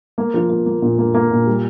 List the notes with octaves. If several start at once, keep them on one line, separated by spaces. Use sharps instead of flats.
A#3
F3
A#3
A#3
A#2
A#3
A#3
A#2
G3